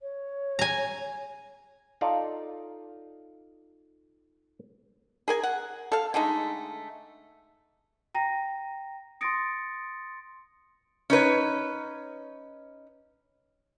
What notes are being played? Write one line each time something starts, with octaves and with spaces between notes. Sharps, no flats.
C#5
G#5 A#5
D#4 F4 A4 D5 F5
G#4 A#4 G#5
F#5
A4 F5
D3 G#3 A3 D#4
G5 A#5 A#6
C6 D#6 A6 A#6 C#7 D7
C#4 D#4 B4 C#5